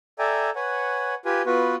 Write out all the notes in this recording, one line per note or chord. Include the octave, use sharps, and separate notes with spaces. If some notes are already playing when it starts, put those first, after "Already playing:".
A4 D5 E5 G5 G#5 A#5
B4 C#5 F#5 G#5
F4 G4 B4 G#5
B3 F4 F#4 B4